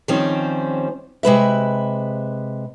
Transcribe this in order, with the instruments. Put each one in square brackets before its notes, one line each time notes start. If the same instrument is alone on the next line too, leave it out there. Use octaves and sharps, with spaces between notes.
[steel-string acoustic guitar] D#3 F3 G3 C4 C#4
C3 G#3 B4 E5